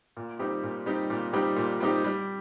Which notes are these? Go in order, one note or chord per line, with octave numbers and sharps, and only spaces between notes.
A#2
G3 C4 D#4 G4
A#2
G3 C4 D#4 G4
A#2
G3 C4 D#4 G4
A#2
G3 C4 D#4 G4
G3